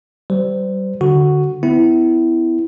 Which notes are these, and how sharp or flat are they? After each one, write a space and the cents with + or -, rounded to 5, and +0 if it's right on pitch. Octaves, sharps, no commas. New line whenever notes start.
G3 -30 C5 -35
D3 +0 F#4 +0
B3 +35 E4 +0